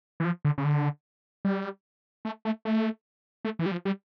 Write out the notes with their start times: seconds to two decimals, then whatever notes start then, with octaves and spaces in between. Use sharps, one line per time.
0.20 E3
0.25 F3
0.45 D3
0.58 C#3
0.65 D3
1.45 G3
2.25 A3
2.45 A3
2.65 A3
3.45 A3
3.59 E3
3.66 G3
3.72 F3
3.85 G3